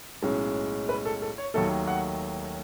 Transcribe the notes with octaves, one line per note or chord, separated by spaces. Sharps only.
B1 A2 G#3 C#4
B4
A4
A4
C#5
D#2 D#3 F#3 A3 A4
F#5